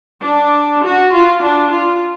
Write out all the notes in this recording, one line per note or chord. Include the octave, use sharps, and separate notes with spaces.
D4
F#4
F4
D4
F4